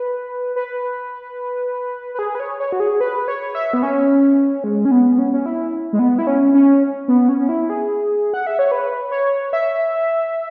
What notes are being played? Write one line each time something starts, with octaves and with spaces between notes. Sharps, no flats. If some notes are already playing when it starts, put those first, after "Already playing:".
Already playing: B4
B4
B4
G#4
B4
C#5
C#5
F#4
G#4
B4
C#5
E5
B3
C#4
G#3
C#4
B3
C#4
C#4
E4
G#3
B3
E4
C#4
C#4
B3
C#4
C#4
E4
G#4
F#5
E5
C#5
B4
C#5
E5